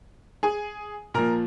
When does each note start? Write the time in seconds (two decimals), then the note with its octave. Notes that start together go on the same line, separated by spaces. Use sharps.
0.43 G#4 G#5
1.14 A#2 F3 A#4 A#5